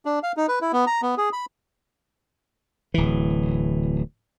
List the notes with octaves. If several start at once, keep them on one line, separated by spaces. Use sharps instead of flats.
D4
F5
D#4
B4
E4
B3
A#5
B3
G#4
B5
D1 E3